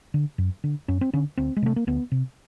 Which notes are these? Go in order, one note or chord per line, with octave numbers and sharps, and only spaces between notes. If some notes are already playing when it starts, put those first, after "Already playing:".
D3
F#2
D3
F#2 C#4
C4
D3 C#4
D2 C4
G#3
C3 A3
A#3
D2 B3
C3